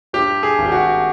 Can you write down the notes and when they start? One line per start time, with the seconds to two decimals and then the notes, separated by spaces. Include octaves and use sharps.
0.13 G2 G4
0.43 G#4
0.58 G#1
0.66 G4
0.72 F#4